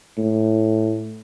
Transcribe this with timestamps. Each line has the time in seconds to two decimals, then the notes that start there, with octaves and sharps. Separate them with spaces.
0.18 A2